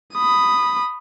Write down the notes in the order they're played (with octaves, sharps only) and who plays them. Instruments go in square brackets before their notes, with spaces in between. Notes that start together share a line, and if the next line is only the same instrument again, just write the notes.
[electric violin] B5 D#6